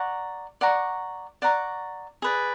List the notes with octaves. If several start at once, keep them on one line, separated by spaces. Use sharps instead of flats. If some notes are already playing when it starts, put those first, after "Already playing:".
Already playing: D5 F#5 A#5 C#6
D5 F#5 A#5 C#6
D5 F#5 A#5 C#6
G#4 B4 D5